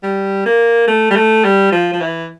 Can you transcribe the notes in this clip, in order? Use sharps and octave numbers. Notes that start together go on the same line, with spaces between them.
G3
A#3
A3
G3
A3
G3
F3
F3
E3